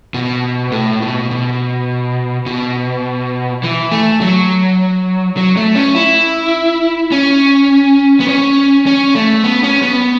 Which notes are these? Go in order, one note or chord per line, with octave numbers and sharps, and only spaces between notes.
B2
A2
B2
B2
B2
E3
A3
F#3
F#3
A3
C#4
E4
C#4
B3
C#4
C#4
A3
B3
C#4
B3